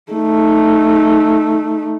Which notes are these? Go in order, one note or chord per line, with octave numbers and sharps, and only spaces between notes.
A3 D#4